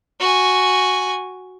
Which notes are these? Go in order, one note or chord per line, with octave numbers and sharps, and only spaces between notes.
F#4 G#5